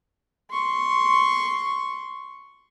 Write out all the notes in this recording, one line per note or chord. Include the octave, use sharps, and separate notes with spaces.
C6 C#6